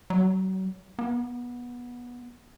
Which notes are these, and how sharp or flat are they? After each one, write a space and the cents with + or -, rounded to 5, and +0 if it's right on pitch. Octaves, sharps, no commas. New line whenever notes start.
F#3 +35
B3 -20